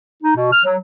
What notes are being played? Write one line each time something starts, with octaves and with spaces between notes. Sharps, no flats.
D#4
B2
F6
F#3